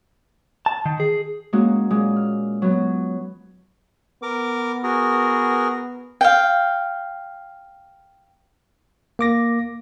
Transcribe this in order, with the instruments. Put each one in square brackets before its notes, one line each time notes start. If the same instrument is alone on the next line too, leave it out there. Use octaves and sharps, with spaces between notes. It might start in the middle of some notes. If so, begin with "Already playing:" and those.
[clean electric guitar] A5
D#3
G#4
[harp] G#3 A#3 C#4 F#4
A#2 G#3
F6
F#3 B3
[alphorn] B3 [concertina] A#4 D6
[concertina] F#4 G#4 A#4
[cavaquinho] F5 G5
[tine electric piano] A#3 D6 A#6